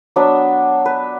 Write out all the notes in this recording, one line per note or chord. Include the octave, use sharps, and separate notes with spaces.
F#3 B3 D4 E5
B4